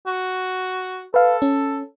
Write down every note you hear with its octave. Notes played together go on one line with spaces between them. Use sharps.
F#4
A4 B4 F5
C#4